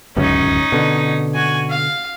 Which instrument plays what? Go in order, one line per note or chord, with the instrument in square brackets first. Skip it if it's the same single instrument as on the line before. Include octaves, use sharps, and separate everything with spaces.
[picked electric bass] D1 C#2 F#2 [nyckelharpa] C#4 D#4
[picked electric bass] B2 D3
[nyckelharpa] F#4 G#5
F5